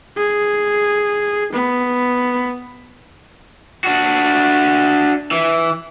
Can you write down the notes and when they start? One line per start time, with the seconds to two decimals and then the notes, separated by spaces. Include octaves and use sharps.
0.17 G#4
1.52 B3
3.84 D4 F#4
5.31 E3